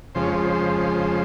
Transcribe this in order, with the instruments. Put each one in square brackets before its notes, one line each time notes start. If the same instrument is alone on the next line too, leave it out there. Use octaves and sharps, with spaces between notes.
[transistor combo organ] F2 C#3 F3 G#3 C5
C#5
C5